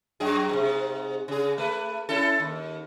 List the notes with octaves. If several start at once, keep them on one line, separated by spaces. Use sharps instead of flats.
F#2 F#3 G#4
G#2 C3
C#3 G#4
A3 B4
C#4 E4 A4
D#2